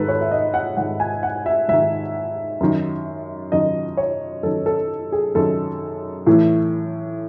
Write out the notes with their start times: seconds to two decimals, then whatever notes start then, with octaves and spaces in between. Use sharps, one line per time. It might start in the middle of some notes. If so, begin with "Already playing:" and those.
Already playing: G#2 D#3 A4 B4
0.08 C#5
0.21 E5
0.31 D#5
0.54 F#5
0.77 G#2 D#3 F#5
1.00 G#5
1.23 F#5
1.46 E5
1.68 G#2 D#3 E5
2.60 F#2 D#3
3.52 F#2 D#3 D#5
3.97 C#5
4.43 F#2 D#3 A4
4.66 A4
5.12 G#4
5.35 F#2 D#3 A4
6.27 A2 E3